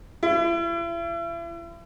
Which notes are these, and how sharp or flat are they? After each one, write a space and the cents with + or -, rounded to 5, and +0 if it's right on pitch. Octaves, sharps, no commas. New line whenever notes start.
E4 +40